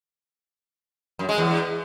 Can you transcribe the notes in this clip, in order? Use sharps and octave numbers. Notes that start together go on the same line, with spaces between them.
F#2
G#3
E2